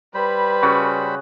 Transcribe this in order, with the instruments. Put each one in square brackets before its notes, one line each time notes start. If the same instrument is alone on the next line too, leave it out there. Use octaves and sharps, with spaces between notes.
[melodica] G3 C5 B5 [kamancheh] B4
[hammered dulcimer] C#3 F#4